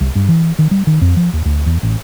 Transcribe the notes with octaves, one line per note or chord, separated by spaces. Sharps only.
C2
G2
E3
D#3
G3
D#3
F2
F3
D#2
D2
E2
A1